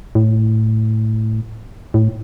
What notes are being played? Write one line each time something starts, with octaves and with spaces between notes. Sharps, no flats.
A2
A2